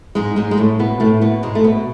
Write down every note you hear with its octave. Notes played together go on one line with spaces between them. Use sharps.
G#2 G#3
G#2 G#3
G#3
A2 A3
B2 B3
A2 A3
B2 B3
G#2 G#3
A3
B2 B3